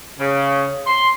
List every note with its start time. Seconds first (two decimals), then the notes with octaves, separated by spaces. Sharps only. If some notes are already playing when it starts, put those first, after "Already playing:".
0.19 C#3
0.86 C6